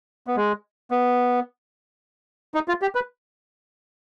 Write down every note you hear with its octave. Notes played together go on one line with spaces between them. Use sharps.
B3
G#3
B3
D#4
F4
G4
B4